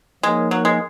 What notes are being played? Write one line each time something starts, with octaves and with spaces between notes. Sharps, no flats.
F3 G#3 A#3 D#4 A#4 C#5
F#3
G#3